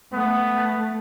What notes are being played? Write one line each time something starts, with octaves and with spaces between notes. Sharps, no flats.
A3 B3